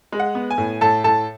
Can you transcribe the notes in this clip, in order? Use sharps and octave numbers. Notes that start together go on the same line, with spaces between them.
G#3
F#5
B3
G#5
A2
A2 A4 A5
A2 A4 A5